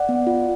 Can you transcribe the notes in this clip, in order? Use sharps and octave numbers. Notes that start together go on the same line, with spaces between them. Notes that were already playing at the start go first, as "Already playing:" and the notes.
Already playing: D5 F#5
B3
F4